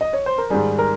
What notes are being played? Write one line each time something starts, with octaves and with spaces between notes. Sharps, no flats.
D#5
C#5
C5
A#4
G#2 D#3 G3 G#4
A#4